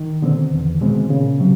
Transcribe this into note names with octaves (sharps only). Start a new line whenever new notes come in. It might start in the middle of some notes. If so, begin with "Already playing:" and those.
Already playing: D#3
B2 D3 G#3 C4
E2
B2 G#3 C4
A#2 C#3
C3 F#3